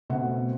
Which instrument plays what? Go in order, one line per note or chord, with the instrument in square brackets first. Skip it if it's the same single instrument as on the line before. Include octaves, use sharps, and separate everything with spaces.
[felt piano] B2 A3 C4 F#5